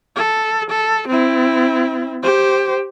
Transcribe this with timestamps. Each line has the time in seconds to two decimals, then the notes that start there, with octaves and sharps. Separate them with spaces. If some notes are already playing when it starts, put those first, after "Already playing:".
0.16 A4
0.70 A4
1.08 C4 E4
2.23 G4 C5